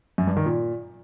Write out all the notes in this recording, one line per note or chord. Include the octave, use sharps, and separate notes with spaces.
F#2
G2
D#3
A#2